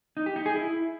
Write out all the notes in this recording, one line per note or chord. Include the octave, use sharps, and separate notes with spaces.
D#4
G4
D#4
G#4
E4